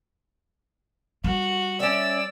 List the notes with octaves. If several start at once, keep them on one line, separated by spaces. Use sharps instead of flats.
G3 F#4
C#4 D5 E5 E6